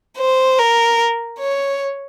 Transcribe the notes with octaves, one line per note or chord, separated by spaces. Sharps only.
C5
A#4
C#5